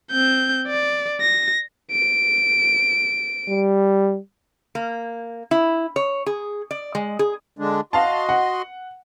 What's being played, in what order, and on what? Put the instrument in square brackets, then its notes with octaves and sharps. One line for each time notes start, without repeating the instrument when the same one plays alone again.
[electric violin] C4 G6
D5
A#6
D7
[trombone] G3
[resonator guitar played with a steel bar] A#3
E4
C#5
G#4
D5
G#3
G#4
[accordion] D3 G#3 D4
[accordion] F#4 D#5 C6 [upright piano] F5 A5
[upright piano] F#5